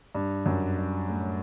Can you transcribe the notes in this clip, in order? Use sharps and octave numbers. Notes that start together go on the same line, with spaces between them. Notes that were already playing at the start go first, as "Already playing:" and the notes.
G2
F#2
G2
A2